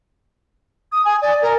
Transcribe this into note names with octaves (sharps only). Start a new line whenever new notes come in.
D#6
G#5
D5
A#4